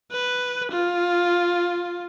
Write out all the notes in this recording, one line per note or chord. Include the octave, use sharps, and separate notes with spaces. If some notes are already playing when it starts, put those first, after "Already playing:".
B4
F4